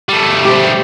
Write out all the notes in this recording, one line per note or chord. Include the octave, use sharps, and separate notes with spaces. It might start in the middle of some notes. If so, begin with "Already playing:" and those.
G3 A3
G4 C5